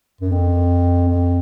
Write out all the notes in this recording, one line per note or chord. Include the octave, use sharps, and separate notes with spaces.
F#2
F2
F2